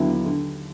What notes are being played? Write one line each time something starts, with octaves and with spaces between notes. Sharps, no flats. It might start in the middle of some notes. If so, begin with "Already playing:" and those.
Already playing: D#2 D3 F#3 B3 E4
D3